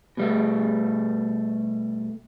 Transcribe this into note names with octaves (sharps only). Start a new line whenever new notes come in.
B2 G3 A3